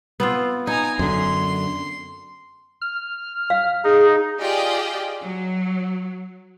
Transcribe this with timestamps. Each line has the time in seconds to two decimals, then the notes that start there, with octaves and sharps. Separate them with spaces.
0.20 B3 C4 F4
0.67 D#4 G#5 A#5
0.99 F#2 D3 C6
2.81 F6
3.50 F5
3.84 D#4 G#4
4.39 F4 G4 G#4 D5 D#5 G5
5.24 F#3